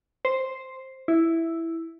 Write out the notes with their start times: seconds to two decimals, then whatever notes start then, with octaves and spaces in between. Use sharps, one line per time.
0.25 C5
1.08 E4